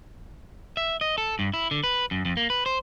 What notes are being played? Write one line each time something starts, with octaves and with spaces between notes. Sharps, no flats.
E5
D#5
A4
G2
E4
D3
B4
F#2
F2
A#3
B4
C5